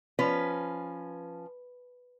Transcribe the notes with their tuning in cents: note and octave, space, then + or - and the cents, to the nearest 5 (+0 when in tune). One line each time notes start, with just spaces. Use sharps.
F3 +0 C#4 +0 B4 +0